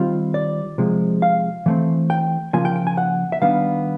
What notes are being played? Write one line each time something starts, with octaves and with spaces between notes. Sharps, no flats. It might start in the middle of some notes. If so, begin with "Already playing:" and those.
Already playing: D#3 G3 C4 F4
D5
C3 F3 G#3
F5
E3 A3 C4
G5
C#3 F3 A#3 F4 G#5
G5
G5
G#5
F#5
E5
D#3 G3 B3 D4 F5